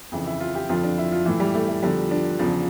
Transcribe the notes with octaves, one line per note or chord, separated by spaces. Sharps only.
F2 C#3 E3
E4
F4
G4
F2 D3 F3 F4
D4
E4
F4
A2 E3 E4
G3
A3
A3
E2 D3 F3 G3
D4
E2 C#3 F3